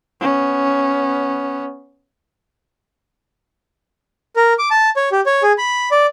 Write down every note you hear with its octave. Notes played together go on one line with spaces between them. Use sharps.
B3 C#4
A#4
D6
A5
C#5
G4
C#5
G#4
B5
D5